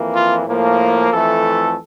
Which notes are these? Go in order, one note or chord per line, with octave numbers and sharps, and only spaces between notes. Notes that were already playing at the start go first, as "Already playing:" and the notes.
Already playing: F2 E3 A#3
F4
A2 F3 A#3
F2 E3 A3 A4